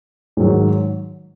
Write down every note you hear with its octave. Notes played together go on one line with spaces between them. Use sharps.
G#2 D#3 F#3